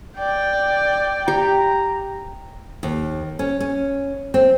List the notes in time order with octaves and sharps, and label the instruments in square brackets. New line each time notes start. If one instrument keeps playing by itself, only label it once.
[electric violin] D5 [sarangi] G5
[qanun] G4 [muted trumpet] A#5
[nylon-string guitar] D#2
C#4
C#4
C4